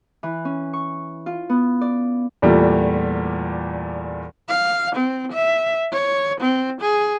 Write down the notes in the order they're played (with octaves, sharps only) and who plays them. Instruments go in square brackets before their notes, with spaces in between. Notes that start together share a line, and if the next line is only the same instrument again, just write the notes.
[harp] E3
C#4
C#6
F4
B3
D5
[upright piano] E2 A#2 G3 A3
[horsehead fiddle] F5
C4
E5
C#5
C4
G#4